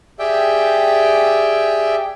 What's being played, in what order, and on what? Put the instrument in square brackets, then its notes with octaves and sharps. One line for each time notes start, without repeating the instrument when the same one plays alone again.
[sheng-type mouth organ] G4 G#4 D5 E5 G5